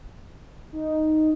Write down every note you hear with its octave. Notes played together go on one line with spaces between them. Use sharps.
D#4